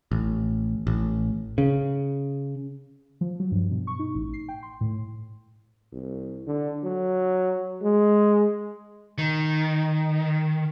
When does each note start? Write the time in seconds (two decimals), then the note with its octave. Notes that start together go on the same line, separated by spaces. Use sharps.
0.11 A1
0.87 A1
1.58 C#3
3.21 F3
3.40 F#3
3.52 G2
3.71 B2
3.87 C#6
3.99 D#4
4.15 A1
4.34 C7
4.49 G5
4.63 C6
4.81 A2
5.93 C2
6.47 D3
6.84 F#3
7.83 G#3
9.18 D#3